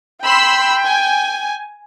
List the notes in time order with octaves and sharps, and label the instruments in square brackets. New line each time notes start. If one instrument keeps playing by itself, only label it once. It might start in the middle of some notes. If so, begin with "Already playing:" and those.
[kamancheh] G5 [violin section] B5 C6 E6
[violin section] G#5